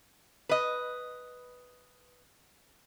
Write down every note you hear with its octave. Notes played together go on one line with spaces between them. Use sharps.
B4 D#5